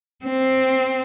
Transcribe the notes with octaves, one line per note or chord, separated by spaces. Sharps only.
C4